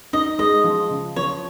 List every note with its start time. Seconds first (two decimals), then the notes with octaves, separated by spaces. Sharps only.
0.13 D#4 D#5
0.39 G#3 D#5
0.64 F3
0.90 C#3
1.16 F3 C#5